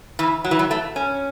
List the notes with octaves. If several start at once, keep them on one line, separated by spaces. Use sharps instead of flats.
E3
F#3
E3
F#3
A3
C#4